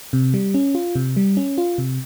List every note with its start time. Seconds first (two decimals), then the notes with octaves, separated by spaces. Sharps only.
0.13 C3
0.34 G3
0.54 C#4
0.75 F4
0.95 C3
1.16 G3
1.37 C#4
1.58 F4
1.78 C3